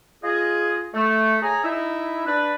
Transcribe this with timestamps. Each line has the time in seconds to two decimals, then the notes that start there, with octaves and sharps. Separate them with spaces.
0.23 F4 G#4 D#5
0.94 A3
1.42 G#4 C#5 G#5 A#5
1.63 D#4 E4 E5
2.25 D4 B4